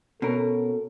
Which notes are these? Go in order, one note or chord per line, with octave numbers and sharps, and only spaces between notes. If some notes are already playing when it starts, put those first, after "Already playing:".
B2 C#4 A4 A#4